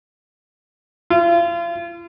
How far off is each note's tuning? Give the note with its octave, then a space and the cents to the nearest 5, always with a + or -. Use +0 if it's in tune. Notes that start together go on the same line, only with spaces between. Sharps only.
F4 -40